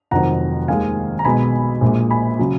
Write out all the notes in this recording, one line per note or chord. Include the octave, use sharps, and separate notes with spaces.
F1 F2 D#3 F#3 F#5 A#5
D#2 D#3 G#3 F5 G#5
A#5
B1 B2 G#3 G#5 B5
A#1 A#2 G#3
G#5 B5
C#3 F#3